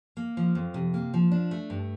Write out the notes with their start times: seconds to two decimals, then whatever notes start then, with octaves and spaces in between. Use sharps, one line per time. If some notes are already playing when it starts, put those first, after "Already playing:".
0.17 A#3
0.37 F3
0.55 F2
0.74 C3
0.94 A#3
1.14 F3
1.32 D4
1.51 A3
1.70 G2